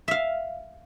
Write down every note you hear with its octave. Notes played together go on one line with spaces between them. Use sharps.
E5 F5